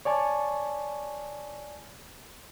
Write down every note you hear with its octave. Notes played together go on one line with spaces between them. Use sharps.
C#5 D5 G#5 A5 C#6